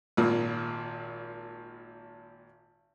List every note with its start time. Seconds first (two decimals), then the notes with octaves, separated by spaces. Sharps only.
0.17 G#1 A#2